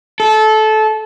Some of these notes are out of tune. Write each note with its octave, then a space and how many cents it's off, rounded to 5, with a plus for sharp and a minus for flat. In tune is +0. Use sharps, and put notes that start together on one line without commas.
A4 -20